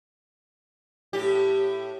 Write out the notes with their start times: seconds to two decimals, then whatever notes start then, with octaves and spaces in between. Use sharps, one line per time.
1.13 A2 G4